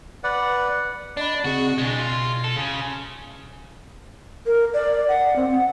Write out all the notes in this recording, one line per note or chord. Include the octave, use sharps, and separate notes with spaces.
B4 D5 F#5
D4 D5 D#5 B5
C#3 C4 F#4 G#4
B2 G#3 D4
F4
A4
C#3
A#4
D5
F#5
C4
F#5